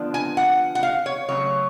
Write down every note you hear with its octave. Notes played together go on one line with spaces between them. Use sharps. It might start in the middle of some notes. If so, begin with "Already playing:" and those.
Already playing: D3 F3 B3 D4
G#5
F#5
F#5
F5
C#5
C#3 F#3 A3 C#5